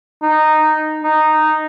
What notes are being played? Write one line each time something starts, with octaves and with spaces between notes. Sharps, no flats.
D#4
D#4